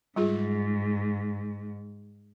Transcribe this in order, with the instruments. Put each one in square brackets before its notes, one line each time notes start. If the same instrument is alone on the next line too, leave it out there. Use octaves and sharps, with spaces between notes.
[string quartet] G#2 [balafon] G3 F4 G#4